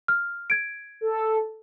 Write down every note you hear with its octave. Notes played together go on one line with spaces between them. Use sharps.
F6
G#6 D7
A4